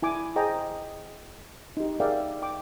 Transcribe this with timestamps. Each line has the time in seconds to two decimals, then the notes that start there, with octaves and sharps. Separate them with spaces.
0.02 E4 G#5 D6
0.36 G#4 C5 D#5 G5 G#5 A#5
1.77 D#4 G4
2.00 G#4 A#4 D5 E5 F5 G5
2.42 G5 D6